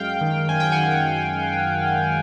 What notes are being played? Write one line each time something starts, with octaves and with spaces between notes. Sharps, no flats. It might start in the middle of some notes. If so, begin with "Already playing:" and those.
Already playing: F#2 G#3 F5 G5
D#3
F#2 G#5
G5
D#3 F#5 G#5